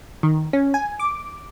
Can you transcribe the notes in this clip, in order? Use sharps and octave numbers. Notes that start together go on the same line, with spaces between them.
D#3
C#4
G#5
D6